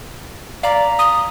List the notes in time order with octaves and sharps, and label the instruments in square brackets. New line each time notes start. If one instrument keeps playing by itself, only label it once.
[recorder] D5 [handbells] F5 A#5 B6
[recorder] D#6